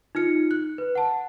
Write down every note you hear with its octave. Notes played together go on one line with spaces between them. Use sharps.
D#4 F4 F6 C#7
F#6
B4
F#5 A5